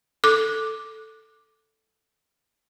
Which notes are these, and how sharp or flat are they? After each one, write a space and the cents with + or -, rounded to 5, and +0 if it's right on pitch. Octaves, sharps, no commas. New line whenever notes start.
A4 +0 D6 +0